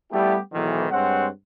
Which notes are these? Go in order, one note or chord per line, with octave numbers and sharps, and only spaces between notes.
G3 A3 B3 E4 G4
B1 G#2 D#3 E3
G2 G#3 C4 C#5 F#5